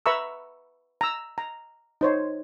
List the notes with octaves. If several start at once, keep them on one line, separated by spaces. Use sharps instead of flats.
B4 E5 A#5 B5 C#6 E6
A#5 E6
A#5
D#4 C5 C#5